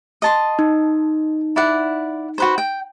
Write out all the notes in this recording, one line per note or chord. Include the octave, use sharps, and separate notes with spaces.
D#5 A5 C6
D#4
E4 D5 F#5
F#4 B4 C5
G5